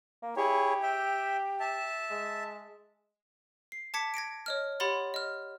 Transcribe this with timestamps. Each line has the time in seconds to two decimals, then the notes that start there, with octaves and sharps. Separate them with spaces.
0.22 A#3
0.37 E4 G4 G#4 C#5
0.83 E5 G5
1.60 E5 A5
2.11 G#3
3.72 C7
3.94 A5 D6 G#6 B6 C#7
4.14 G#6 A#6 C#7 D7
4.46 C#5 D#5 F6
4.80 G4 C#5 F#5 B5 C6 A6
5.14 D#5 F6